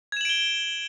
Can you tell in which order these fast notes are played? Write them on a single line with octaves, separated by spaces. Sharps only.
G#6 E7 F#7 D7 G7